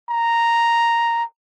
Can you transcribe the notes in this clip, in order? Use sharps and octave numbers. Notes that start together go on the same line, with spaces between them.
A#5